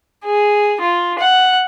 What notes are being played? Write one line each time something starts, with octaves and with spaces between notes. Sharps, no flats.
G#4
F4
F#5